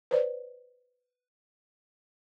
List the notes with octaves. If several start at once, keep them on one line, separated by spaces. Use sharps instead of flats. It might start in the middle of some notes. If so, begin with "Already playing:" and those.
B4 C5 D5